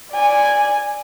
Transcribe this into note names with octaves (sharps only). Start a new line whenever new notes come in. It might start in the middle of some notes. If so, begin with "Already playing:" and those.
D5 G#5